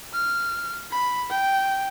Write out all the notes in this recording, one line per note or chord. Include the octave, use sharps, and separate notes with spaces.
F6
B5
G5